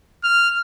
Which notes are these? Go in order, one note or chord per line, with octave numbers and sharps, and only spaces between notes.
F6